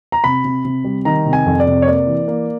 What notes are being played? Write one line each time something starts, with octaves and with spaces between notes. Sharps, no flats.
A#5
C3 B5
C3
C3
G3
D#3 A#5
C3
G#5
F2
D5
C3
C#5
A#3 D5
E3
A#3